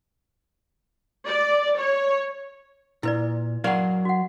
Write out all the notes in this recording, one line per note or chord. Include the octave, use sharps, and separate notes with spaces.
D5
C#5
A#2 E4 B4 D5
F#3 A#4 D5 F5 F#5
F#4 F#5